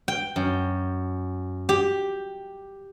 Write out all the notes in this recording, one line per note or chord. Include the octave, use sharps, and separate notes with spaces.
G5
F#2
G4